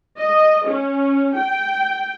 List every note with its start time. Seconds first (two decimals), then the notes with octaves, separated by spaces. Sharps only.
0.18 D#5
0.67 C#4
1.36 G5